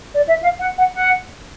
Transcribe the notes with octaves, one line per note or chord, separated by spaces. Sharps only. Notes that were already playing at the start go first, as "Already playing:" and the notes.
D5
E5
F5
F#5
F#5
F#5